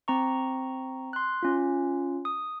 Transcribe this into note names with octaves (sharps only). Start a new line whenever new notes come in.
C4 A#5 C#6
C6 F#6
C#4 F4
D#6